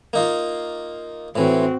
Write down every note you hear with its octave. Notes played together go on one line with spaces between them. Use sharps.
A#3 D#4 F4
A2 E3 C4 F#4